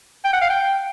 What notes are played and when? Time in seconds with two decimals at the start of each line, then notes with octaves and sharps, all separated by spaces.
0.24 G5
0.33 F#5
0.41 F5
0.50 G5